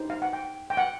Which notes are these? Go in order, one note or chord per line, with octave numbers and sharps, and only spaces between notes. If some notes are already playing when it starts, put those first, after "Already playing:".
Already playing: D#4 G4 C5
F5
F#5
G5
G5
F#5